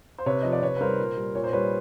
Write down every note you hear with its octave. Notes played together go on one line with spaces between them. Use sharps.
C5
C3 B4 C#5
F3 D#5
D5
C3 B4 C#5
B4
D#3 G3 A#4 C5
A#2
G3
A#2 C#5
C5
G3 B4 C#5